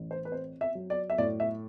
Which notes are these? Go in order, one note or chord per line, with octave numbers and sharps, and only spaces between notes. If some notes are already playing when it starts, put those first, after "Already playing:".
Already playing: A1
C5
B4
C4 C5
E5
F#3
D5
E5
A2 D5
E5